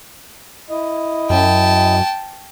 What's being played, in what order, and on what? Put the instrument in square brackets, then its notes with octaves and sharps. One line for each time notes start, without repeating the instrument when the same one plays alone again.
[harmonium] E4 D#5
[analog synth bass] F#2 [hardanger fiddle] G5 A5